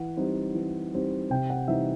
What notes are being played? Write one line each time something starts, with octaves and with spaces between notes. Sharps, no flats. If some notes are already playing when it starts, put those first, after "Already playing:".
Already playing: E3 F#5
G3 C4 D#4
E3
G3 C4 D#4
C3 G5
F#5
E3 G3 C4 D#4 E5